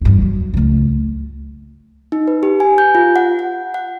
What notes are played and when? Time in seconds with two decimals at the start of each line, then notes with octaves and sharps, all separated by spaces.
0.01 E2 G2
0.22 F#3
0.54 C#2 A3
2.12 D#4
2.28 B4
2.43 G4
2.60 G#5
2.78 G6
2.95 F4
3.16 F#5
3.39 F#5
3.74 F#5